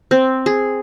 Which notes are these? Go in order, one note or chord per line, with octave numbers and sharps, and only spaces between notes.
C4
G#4